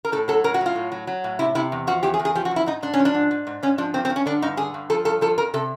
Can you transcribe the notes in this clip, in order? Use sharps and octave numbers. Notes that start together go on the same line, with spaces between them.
A#4
A2 A4
F#3 A4
A2 A#4
F#4
F#3
F4
A2
F#3
F#3
A2
C3 E4
C3 E4
E2
F3 F#4
E2 G4
G#4
E2
G#4
F3 G4
F#4
E2
E4
G#2 D#4
G#2 D4
C#4
F3
D4
G#2
G#2
G#2
G#2 C#4
F3 D4
G2 C4
C4
G2
C#4
D3 D4
G2 D#4
D3 G#4
G2
F3 A4
G2 A4
F3 A4
F2 A#4
C3 A4